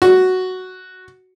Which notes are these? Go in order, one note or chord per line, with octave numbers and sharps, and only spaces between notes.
F#4